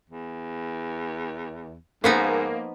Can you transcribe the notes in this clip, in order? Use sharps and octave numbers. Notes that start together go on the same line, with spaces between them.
E2
G#2 F3 A#3 B3 D#4